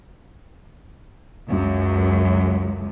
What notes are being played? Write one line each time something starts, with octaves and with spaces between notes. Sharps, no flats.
C#2 F#2